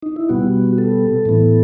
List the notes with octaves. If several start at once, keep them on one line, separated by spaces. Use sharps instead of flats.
D#4
E4
B2 G3 B3 F#4
A4
A2 E3 B3